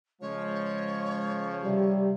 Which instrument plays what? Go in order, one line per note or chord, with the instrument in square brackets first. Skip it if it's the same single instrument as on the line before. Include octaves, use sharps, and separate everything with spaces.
[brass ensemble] C#3 F3 [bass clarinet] G#3 [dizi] C#5
[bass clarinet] C3 [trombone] G3